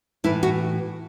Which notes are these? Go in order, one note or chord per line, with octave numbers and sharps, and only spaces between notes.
A2 E3 E4
F#4